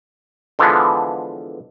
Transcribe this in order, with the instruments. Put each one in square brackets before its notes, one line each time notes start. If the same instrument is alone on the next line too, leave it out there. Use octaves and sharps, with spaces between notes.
[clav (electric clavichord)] D3 E3 F3 G#3 B3